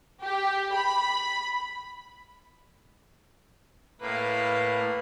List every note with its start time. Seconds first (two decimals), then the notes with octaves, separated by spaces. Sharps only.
0.23 G4
0.74 B5
4.01 A2 A#3 B4 F5